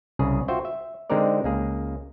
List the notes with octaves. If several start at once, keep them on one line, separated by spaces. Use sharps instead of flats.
C2 C#3 G#4
F4 F#4 C5 E5 G5
E5
D3 G#3 C4 D#4 A#4 D5
C#2 A#3 G#4